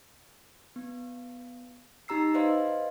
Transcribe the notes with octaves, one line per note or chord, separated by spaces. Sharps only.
B3
D#4 G4 A#5 E6 C7
B4 C5 D5 D#5 F5 C6